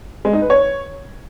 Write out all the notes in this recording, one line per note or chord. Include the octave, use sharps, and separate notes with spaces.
G#3
D#4
B4
C#5